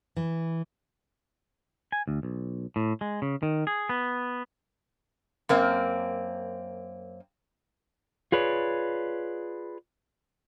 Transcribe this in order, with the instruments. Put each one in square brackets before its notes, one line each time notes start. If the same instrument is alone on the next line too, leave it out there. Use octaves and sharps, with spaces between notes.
[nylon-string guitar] E3
[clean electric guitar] G#5
D2
B1
A2
G#3
C#3
D#3
G#4
B3
[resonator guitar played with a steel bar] F#2 A#3 C4
[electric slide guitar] F4 G#4 B4 C#5 D5